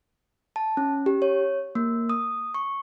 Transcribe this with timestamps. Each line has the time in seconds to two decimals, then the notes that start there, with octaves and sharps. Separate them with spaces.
0.56 A5
0.77 C#4
1.06 G4
1.22 C#5
1.75 A#3
2.10 D#6
2.54 C#6